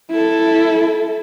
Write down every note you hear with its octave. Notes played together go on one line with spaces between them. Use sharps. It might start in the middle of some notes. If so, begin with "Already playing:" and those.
E4 A4